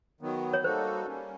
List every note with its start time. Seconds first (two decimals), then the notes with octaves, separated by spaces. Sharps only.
0.21 D#3 F#3 B3
0.53 C#5
0.64 G3 A#3 D#4 F#4 A4 C5
1.06 G3 A#3 C#4